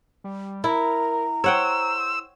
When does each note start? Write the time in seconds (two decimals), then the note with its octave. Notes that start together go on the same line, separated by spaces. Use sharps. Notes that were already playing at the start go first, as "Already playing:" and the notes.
0.24 G3
0.64 E4 A#4 A#5
1.44 C5 C#5 F#5 G5 E6